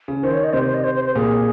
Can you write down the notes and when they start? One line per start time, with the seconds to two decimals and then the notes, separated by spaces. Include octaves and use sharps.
0.08 C#3
0.23 D#3 C5
0.33 C#5
0.44 D#5
0.53 C3 C5
0.64 C5
0.74 D#5
0.84 C5
0.94 C5
1.05 C5
1.15 A#2 G#4